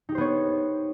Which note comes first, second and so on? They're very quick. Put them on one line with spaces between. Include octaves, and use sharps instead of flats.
D#4 G4 C5 B3 C#5